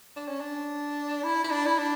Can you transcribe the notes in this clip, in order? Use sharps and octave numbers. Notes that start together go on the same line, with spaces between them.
D4
C#4
D4
E4
E4
D4
E4
D4